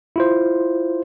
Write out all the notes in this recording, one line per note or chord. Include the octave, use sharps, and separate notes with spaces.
E4 F4 C5